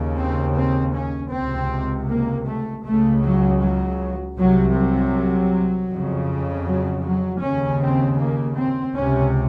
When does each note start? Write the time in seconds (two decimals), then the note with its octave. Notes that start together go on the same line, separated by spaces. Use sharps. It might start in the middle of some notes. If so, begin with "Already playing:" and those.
Already playing: D#2 C#3
0.18 C4
0.57 C4
0.95 C#4
1.32 C#2 C3 C4
2.09 A#3
2.47 A3
2.85 C#2 C#3 A3
3.23 F#3
3.61 F#3
4.37 C2 C3 F#3
4.76 F#3
5.90 F2 C#3
6.67 F#3
7.05 F#3
7.42 D#2 C#3 C#4
7.81 C4
8.19 A#3
8.57 C4
8.96 C#2 C3 C#4